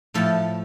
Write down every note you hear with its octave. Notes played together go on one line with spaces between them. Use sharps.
A2 F3 A3 A4